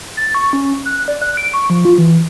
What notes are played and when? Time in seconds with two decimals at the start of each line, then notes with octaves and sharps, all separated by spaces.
0.17 A6
0.35 C#6
0.53 C#4
0.86 F#6
1.08 D5
1.22 F#6
1.37 D7
1.54 C#6
1.70 F3
1.85 F4
1.98 E3